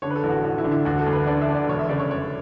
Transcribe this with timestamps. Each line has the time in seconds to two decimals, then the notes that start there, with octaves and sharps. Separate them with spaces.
0.02 D3 C#5
0.10 B4
0.16 A4
0.23 A1
0.30 F#4
0.44 A1 F#4
0.58 E4
0.64 D3
0.72 E4
0.85 D2 F#4
0.99 A4
1.06 D2
1.13 B4
1.27 D3 D5
1.42 E5
1.49 D3
1.55 D5
1.68 E1 C#5
1.79 E5
1.89 C#3 D5
2.00 C#5
2.10 E1 C#5